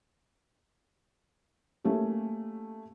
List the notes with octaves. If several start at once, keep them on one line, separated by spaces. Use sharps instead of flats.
A3 A#3 C#4 G4